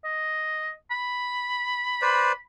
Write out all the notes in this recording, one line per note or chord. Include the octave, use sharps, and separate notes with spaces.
D#5
B5
B4 C5 D5